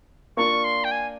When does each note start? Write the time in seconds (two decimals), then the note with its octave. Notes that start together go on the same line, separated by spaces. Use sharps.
0.37 A#3 D4 F4 A#4 D5 C#6
0.64 C6
0.84 G5
0.91 G#5